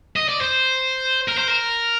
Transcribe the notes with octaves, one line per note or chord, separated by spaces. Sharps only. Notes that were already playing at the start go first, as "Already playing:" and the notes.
D#5
D5
C5
A#4
C5
A#4